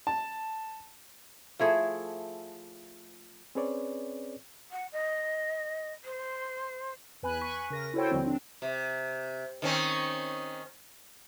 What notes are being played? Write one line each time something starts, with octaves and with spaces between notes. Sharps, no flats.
A5
F3 A3 E4 G#4
C4 C#4 G#4 B4 C#5 D5
F#5
D#5
C5
E2 B4 G#5 B5 F#6
G#5 C#6 F#6 B6 D#7
C#3 A#4 A#6
E4 F#4 A4 C5 C#5 G5
D#2 D3 F3 G3 C4
C4 D4
C3
D#3 C4 C#4